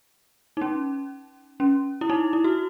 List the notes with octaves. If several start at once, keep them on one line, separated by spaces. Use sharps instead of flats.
D#4
C#4
C#4
E4
D#4
E4
F#4